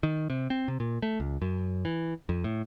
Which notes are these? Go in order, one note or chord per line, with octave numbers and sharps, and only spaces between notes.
D#3
C3
C4
C3
A#2
A3
C#2
F#2
E3
F2
A2